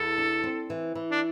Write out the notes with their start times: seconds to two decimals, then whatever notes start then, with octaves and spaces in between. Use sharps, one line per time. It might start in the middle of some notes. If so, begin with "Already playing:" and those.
Already playing: E2 A4
0.18 D4
0.44 C4
0.70 E3
0.95 E3
1.12 D4